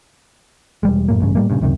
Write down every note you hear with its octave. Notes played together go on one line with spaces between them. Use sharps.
E1 G3 G#3
F#2 A2 A#3
A1 G2 C#3
A2 G3 A#3
G2 A#2 C#3
C#2 F#2 C3 D#3